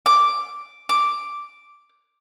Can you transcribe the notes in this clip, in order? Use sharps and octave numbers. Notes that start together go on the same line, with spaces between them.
D6
D6